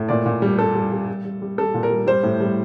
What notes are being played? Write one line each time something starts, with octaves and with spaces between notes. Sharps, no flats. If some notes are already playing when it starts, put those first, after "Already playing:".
Already playing: A2
A#2 D5
A#2
G3
G3 A4
G3
G3
G3
G3
G3
G3 A4
A#2
A#4
G3
G3 C5
A2
G3